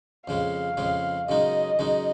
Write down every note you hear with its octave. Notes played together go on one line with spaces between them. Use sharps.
F2 C#3 G#3 F5
F2 C#3 G#3
F#2 C#3 G#3 D#4 D#5
F#2 C#3 G#3 D#4